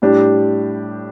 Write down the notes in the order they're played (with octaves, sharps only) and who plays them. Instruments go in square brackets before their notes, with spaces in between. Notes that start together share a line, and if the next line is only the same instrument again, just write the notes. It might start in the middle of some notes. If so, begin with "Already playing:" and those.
[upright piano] A2 G3 D4 G4